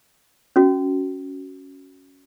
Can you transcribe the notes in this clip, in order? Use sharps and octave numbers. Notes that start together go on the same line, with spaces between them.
C#4 F#4